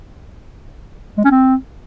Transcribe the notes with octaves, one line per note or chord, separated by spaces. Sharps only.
G#3
C#4
C4